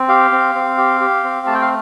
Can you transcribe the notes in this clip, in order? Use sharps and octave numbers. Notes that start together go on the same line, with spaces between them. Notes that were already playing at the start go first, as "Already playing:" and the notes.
Already playing: C4
G4 F5
C4
C4
G4
G4
C4
A3 A5
G5
F5